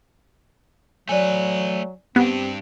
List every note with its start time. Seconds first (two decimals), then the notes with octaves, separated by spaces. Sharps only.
1.09 F#3 A3 B4 D5 G#5
2.16 G2 B3 C4 D4 G4